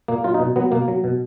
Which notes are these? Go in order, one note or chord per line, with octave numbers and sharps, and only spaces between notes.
A#2 A#3
F#3 F4
D#4
B2
F#3 B3
B2 A#3
F#3
B2